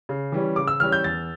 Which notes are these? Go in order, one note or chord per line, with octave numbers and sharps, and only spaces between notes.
C#3
E3 G3 C#4
C#3 D6
E6
E3 G3 C#4 F6
G6
E2 A6